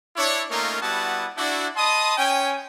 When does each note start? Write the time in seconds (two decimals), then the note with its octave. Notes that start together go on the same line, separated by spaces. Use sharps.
0.16 D4 E4 C#5
0.50 A3 A#3 C#4 D#4 F4 A#4
0.81 G3 B3 E4 F#4 F#5 A5
1.37 D4 E4 F#4
1.77 D#5 A5 B5 C6 D#6
2.18 C#4 G5 G#5